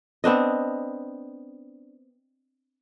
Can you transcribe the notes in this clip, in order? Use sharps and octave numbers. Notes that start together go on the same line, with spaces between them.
B3 C4 D4 D#5